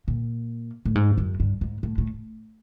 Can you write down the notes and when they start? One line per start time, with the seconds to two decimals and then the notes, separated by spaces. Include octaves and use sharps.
0.08 A#2
0.85 A2
0.95 G#2
1.18 F#2
1.40 G2
1.61 G#2
1.83 A2
1.98 A2